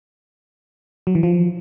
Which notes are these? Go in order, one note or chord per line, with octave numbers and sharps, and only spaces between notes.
F#3
E3
F3